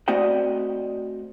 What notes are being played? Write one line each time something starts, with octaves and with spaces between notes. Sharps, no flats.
A3 C4 F#4 D5 D#5 G5